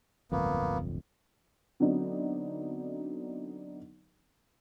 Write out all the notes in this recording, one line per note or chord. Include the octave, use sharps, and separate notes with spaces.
D1 G1 F2 A#3 B3
D3 F#3 B3 C4 D4 D#4